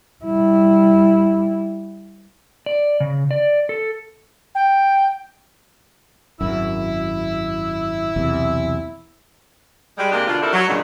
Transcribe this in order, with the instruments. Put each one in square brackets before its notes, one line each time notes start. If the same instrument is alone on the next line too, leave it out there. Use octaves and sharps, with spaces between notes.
[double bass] G3 E4
[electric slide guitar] D5
C#3
D5
A4
[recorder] G5
[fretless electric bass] G#1 F#2 [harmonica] E4 E6
[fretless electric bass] B1 E2 C3
[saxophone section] G3 G#3
C3 G#3 A#3 D4 G4
B2 D3 D4 F4
C4 D4 E4 G4 A4 A#4
F#3
G2 A#2 C#3 G3 G#3 D4